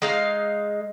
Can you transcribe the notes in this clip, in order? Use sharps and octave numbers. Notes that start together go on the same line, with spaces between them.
G#3 D#4 F5